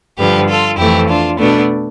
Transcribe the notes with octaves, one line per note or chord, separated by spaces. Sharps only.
G2 D3 F3 G4 B4
F4 A4
F2 E3 A3 E4 G4
D4 F4
B2 A3 B3 D4